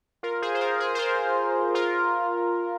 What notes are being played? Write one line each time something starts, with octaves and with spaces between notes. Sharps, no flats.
F4 A#4
G#4 C5
C5
F4 A#4
G#4
C5
F4 A#4
F4 A#4